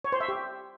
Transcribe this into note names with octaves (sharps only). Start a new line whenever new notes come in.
C#5
C5
E5
G4